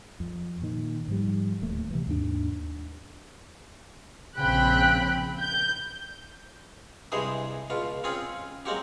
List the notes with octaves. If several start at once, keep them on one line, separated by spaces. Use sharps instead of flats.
F2
A#2 D#3
G#2 F3 G3
D1 D#2 A3
C3 E3
D#2 G#2 D4
A#1 C#3 C4 G5 B5 F#6
G6
G2 C3 E3 G#3 G#4 C5
C#2 B2 F4
C4 C#4 F4 G#4
F#3 G#3 A#3 C4 F#4 G4